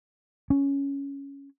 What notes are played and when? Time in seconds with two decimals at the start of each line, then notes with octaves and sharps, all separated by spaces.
0.50 C#4